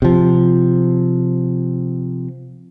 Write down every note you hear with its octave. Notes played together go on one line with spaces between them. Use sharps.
C3 F3